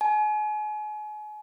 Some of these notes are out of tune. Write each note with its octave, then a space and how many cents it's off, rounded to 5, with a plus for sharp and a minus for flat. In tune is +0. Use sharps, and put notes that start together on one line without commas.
G#5 +35